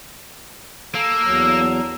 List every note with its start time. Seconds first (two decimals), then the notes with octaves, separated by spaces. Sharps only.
0.95 A#3 A4 E6
1.23 E2 F#3 A#5